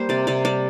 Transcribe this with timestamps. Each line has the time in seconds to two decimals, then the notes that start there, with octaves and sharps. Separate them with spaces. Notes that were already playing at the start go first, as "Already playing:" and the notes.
Already playing: G3 A#3 C5
0.09 C3 D5
0.27 C3 D5
0.45 G3 D5